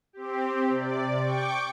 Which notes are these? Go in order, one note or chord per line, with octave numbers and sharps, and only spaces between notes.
C4 G4
C3 D5
G5 C#6 D6